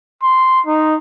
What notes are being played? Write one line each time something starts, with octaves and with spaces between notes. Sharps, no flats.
C6
D#4